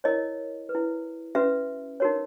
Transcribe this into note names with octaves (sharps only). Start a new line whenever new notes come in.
E4 A#4 C#5 D#5
B4
E4
C#4 F#4 B4 E5
D#4 F#4 A#4 C#5